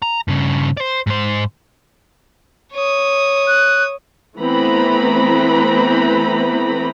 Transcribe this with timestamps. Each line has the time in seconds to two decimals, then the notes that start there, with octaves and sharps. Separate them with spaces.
0.02 A#5
0.28 G2 C#3
0.77 C5 D5
1.07 G#2 C5
2.73 C#5 D#6
3.47 F#6
4.38 E3 A3 B3 C4 A#5 B5